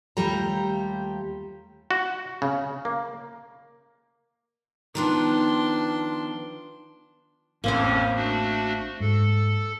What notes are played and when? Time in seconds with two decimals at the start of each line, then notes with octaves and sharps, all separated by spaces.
0.17 D#2 G3 A3 F4 G4 A#5
1.91 F#4
2.42 C#3
2.85 A#3
4.95 D#3 F3 B3 D4 C6
7.64 A1 F2 A2 A#3 C4 C#4 C5
8.15 A3 D4 F#4
9.00 G#2 A4